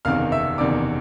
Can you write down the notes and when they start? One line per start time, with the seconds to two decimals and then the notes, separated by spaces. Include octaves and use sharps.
0.05 F#1 E2 C3 D#3 F5 F6
0.32 E5 E6
0.58 F#1 E2 C3 D#3 D5 D6